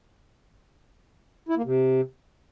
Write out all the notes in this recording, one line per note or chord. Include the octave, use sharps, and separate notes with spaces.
E4
A#3
C3